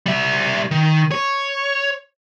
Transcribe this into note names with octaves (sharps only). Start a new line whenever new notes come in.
G3 E5
D#3
C#5